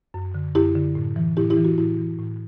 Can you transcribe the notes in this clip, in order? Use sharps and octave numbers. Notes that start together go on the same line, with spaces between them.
F#2
D3
F#2 E4 G4
D3
A2
E3
A2 E4 G4
E4 G4
E3
F#4
A2 E4
E3
A2